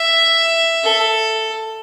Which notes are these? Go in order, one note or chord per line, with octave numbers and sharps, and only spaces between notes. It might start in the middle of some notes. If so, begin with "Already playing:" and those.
Already playing: E5
A4